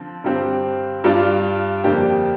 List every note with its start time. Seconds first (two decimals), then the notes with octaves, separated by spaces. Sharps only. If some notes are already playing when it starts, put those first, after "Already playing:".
Already playing: D3 F3 C4
0.24 G2 D3 G3 C4 G4
1.04 G2 G3 D4 F4
1.84 F2 D3 A#3 D4 G4